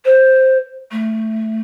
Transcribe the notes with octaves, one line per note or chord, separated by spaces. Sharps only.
C5
A3